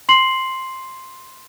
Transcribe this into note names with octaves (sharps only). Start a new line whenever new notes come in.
C6 C7 F#7